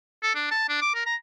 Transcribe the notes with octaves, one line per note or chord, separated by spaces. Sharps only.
A4
D4
A5
D4
D6
A#4
A#5